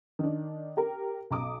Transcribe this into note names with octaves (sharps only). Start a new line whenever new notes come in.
D#3 D4
G4 A#4
B1 A#5 D6 D#6